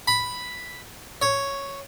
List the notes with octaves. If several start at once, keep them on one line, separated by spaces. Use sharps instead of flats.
B5
C#5